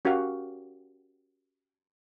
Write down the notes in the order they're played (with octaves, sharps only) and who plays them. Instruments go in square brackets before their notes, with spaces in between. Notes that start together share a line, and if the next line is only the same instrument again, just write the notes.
[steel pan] C#4 F#4 G4 A#4 F5